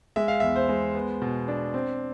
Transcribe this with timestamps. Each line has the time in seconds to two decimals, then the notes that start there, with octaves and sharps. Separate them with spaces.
0.16 G#3 E5
0.28 F5
0.40 E2 E5
0.56 C5
0.69 G#3
0.95 B3
1.22 B2
1.48 D4
1.74 C4